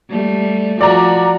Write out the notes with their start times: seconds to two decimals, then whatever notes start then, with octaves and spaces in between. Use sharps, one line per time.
0.10 G3 A3
0.81 F3 F#4 D5 A#5